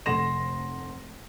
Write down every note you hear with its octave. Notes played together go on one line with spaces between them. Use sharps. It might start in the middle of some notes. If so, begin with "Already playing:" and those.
F1 A3 F#5 C6 A#6 E7